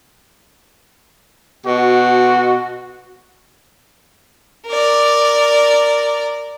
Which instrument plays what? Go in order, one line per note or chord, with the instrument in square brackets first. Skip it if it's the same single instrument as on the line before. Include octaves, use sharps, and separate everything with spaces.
[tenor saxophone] B2 [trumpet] F#4
[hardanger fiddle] A#4 D5